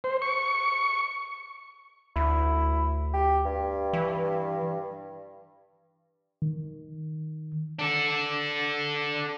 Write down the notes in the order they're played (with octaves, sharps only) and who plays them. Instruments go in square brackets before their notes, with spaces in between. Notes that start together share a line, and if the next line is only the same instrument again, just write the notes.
[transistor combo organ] C5
C#6
[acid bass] D2 [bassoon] E4
[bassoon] G4
G2
[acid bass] E3
[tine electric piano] D#3
[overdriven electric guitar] D4 A4